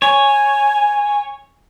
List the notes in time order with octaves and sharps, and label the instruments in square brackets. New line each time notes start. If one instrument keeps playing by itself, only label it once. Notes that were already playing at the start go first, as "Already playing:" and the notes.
[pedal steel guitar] C#5 [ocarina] G#5